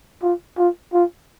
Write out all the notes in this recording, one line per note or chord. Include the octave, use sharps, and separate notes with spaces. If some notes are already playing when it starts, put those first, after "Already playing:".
F4
F4
F4